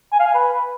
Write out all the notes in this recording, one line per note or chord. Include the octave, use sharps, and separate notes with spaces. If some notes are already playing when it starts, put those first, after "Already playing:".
G#5
F5
G#5
B4